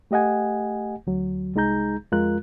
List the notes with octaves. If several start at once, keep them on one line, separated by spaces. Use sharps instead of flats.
A3 G4 D#5 F#5 G#5
D2 F#3
C2 G#3 D#4 G#4 A#5 G6
F2 G#3 F4 A#4 F#6